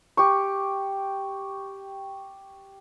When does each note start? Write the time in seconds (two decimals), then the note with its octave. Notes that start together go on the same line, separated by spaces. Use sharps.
0.17 G4 C#6